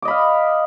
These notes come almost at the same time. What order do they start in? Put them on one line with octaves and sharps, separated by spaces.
D6 D#5 B5 F5